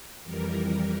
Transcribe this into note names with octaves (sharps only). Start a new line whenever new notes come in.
F2 E3 G3 A#4